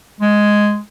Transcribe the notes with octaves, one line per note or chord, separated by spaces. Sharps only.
G#3